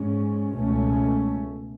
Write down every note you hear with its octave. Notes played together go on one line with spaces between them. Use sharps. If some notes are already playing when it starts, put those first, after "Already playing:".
Already playing: G#2 G#3 C#4
C#2 B2 A3 C#4